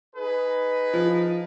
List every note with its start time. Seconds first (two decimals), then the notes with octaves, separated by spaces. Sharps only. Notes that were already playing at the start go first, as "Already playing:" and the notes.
0.15 D#4 G#4 B4
0.93 F3